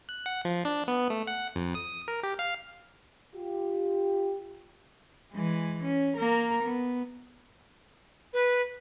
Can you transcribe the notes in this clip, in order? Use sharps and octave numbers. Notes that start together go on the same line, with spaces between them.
F#6
F#5
F3
D4
B3
A3
F#5
F2
D#6
A#4
G4
F5
F4 G4
E3 G#3
C#4
A#3 A#4
B3
B4